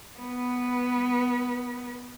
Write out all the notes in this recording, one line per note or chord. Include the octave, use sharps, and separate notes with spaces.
B3 B4